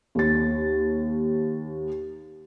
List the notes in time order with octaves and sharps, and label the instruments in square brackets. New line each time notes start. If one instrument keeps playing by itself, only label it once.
[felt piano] D#2 A6